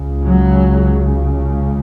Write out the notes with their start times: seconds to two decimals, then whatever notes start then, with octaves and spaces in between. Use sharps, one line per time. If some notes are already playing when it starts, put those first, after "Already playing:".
Already playing: C#2 C#3
0.26 F#3